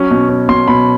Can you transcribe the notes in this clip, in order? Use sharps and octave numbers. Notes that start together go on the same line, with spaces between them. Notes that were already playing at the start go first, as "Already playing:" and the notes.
Already playing: F#3 C#4
B2
C#4
B2 C6
B2 B5